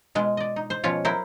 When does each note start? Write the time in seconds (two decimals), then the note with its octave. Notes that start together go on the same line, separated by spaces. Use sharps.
0.15 B2 G#3 F4
0.37 D5 D#5
0.56 D#4
0.70 C5
0.84 B2 F3 C#4 F4 C#5
1.05 F#3 E4 A#4 C5